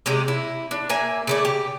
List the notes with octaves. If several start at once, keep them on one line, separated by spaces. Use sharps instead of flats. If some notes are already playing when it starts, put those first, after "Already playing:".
C3 G#3 G4
E4
D4
A#3 E5 G#5
C#3 A3 D5
G4